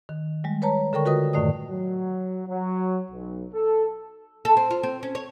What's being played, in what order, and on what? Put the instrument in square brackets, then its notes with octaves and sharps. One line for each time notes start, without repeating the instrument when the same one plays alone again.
[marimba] D#3
G3 G#3
B4 C#5 A5 A#5
D3 A4 A#4 G5 C#6
F4 F#4 A#4 B4 D#5 D#6
F#2 A2 D#3 A3 D5 D#6
[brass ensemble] F#3
F#3
B1
A4
[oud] A4
C4
F4
C4
C#4
C#5